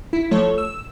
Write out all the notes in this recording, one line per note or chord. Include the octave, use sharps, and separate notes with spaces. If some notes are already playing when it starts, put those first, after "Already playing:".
E4
F3 A3 A4 C#5
E6